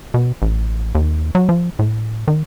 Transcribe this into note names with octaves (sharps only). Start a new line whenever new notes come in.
B2
A1
D#2
F#3
F3
A2
D#3